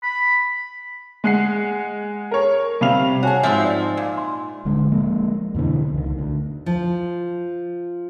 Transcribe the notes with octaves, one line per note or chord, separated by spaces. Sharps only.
B5
G#3 F#5 C7
A#4 C#5
C3 G3 F5 F7
F#4 G#4 C#5 G#5 A5
G#2 F3 C4 E5
D5
A#2
C6
D1 D3 G#3
F3 G#3 A#3
F2 B2 D3 E3
C#2 D#3
D2
F3